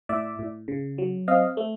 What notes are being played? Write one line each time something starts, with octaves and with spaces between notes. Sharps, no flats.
A2 D5 E5
A2
C#3
F#3
C4 D#5 F5
A3